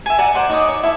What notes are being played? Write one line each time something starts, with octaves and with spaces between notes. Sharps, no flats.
E5 G#5
D5 F#5 G#5 A#5
C5 D5 F#5 C6
D#4 C#5 D5 D#6
C#5
E4 A4